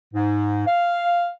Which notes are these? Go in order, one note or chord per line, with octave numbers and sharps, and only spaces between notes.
G#2
F5